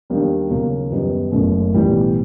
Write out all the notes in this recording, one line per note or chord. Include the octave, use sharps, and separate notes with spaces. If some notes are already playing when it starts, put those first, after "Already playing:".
D#2 D#3 G3 A#3 D4
D#2 C#3 F#3 A#3 C#4
F#2 D#3 G3 B3 D#4
F#1 F#2 C#3 F#3 A3
B1 A2 E3 G3